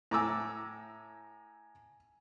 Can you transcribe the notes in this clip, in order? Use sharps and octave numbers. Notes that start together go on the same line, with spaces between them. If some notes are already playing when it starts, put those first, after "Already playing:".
A2 G#5 A#5 D6 E6